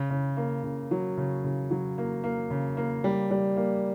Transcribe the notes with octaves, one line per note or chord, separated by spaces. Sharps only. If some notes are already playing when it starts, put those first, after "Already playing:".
Already playing: C#3
C#3
A#3
C#3
F#3
C#3
C#3
F#3
A#3
A#3
C#3
A#3
G3
G3
A#3